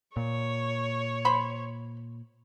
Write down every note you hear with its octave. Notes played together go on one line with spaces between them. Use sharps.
A#2 C#5
C5 B5